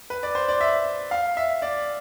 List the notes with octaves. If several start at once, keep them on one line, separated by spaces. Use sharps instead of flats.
B4
D5
C5
D5
E5
F5
E5
D5